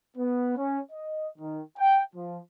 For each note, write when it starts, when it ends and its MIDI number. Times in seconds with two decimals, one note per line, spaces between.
0.17 0.55 59
0.56 0.79 61
0.92 1.27 75
1.38 1.61 51
1.76 2.01 79
2.15 2.37 53